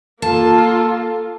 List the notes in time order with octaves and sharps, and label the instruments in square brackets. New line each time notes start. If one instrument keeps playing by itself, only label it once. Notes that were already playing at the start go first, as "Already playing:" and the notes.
[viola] A#3 F4 [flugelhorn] A4 [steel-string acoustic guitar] A5